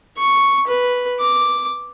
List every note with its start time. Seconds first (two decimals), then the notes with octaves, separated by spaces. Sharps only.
0.18 C#6
0.67 B4
1.20 D6